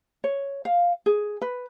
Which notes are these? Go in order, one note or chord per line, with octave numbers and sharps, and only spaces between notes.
C#5
F5
G#4
B4